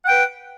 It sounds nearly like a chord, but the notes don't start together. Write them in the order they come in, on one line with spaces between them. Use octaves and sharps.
F#5 G5 B4